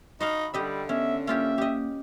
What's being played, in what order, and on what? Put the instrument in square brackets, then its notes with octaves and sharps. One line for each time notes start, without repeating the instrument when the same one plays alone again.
[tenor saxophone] D#4 [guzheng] F#4 D#5 F5 [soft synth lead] B5
[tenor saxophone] D3 [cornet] G3 [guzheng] G4 D#5 E5
[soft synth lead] B3 [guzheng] C#4 [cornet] E5
[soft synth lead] A#3 [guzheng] C#4 F4 G4 [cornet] E5
[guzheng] G4 D#5